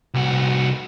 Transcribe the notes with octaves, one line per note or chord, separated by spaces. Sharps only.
C2 F#4